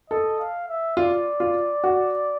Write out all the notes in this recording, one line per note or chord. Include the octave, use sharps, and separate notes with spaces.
A4 D#5
F5
E5
F4 D5
F4
F#4